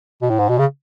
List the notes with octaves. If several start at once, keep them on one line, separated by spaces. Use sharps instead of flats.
B2
A2
G#2
B2
C#3